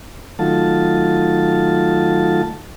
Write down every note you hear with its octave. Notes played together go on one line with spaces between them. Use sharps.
D#3 F#3 A3 F4 A5